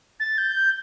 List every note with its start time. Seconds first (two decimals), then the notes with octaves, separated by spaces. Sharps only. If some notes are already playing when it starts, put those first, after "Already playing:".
0.19 A6
0.38 G6